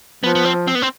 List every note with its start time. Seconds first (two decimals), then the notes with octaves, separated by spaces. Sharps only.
0.24 F3 B3
0.35 B3
0.45 C4
0.68 C4
0.75 B3
0.82 C4